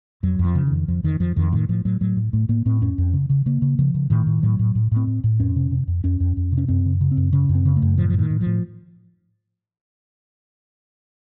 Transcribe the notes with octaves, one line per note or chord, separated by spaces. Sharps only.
F2 F#3
F2
F3
C#3
D#3
F2
F2 F3
F2 D#3
F2 F3
F2 D#3
A2 D#3
A2 F3
A2 F#3
A2 F#3
A2
A2 A3
A2 A#3
A2 C4
F2 C#4
F2
C#3
C#3
C#3 A#3
C#3
C#3 F3
C#3
A2 D#3
A2
A2 F#3
A2
A2
A2 C4
A2
A2
F2 C#4
C3
C3
F2
F2 C#4
F2
F2
C3
C#4
F#2 C4
C#3
C#3
C4
F#2
C#3 C#4
F#2
C4
C#3
A3
F#2
A2 F3
F3
A2
D#3
A2
F3
A2